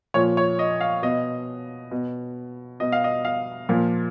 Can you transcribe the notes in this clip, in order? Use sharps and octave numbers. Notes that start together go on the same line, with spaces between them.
A#2 F3 C#5
C#5
D#5
F5
B2 D#5
B2
B2 D#5
F5
D#5
F5
A#2 F3